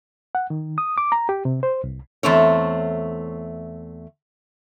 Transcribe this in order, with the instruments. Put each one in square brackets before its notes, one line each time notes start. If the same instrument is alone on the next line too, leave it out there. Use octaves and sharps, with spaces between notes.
[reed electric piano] F#5
D#3
D#6
D6
A#5
G4
C3
C5
C2
[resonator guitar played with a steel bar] E2 A3 C4 C#5